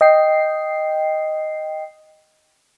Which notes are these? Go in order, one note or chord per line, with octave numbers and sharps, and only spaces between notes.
D#5 G5 C7